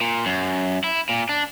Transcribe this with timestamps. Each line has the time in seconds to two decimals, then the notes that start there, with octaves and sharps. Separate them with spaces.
0.01 A#2
0.26 F#2
0.84 E4
1.09 A#2
1.29 D4